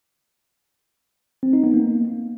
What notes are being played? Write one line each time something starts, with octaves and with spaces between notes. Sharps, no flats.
C4
D#4
B3
A#3